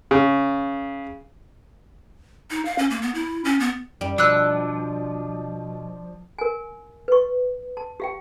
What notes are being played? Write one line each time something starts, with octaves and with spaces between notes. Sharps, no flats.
C#3
D#4
F5
C#4
A#3
B3
E4
C#4
B3
F#2 G3
B2 F3 D4 E6 F#6
A#4 G#5
B4 C#6
A5
G4 F5 G5